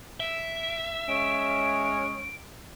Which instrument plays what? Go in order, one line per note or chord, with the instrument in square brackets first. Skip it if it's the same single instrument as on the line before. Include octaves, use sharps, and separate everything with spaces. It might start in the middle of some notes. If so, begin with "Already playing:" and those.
[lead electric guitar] E5 [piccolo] D7
[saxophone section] G#3 C#4 [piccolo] D7